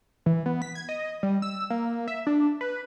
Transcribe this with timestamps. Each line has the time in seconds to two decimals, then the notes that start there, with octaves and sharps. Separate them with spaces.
0.26 E3
0.46 B3
0.62 B6
0.75 G#6
0.89 D#5
1.23 G3
1.42 E6
1.70 A#3
2.08 E5
2.27 D4
2.61 B4